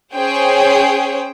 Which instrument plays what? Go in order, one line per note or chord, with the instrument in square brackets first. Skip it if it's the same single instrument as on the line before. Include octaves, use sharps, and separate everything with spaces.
[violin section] C#4 G#4 C5 G5